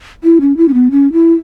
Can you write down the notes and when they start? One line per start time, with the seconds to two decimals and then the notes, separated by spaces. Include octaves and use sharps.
0.24 E4
0.41 C#4
0.57 E4
0.68 C#4
0.74 B3
0.91 C#4
1.13 E4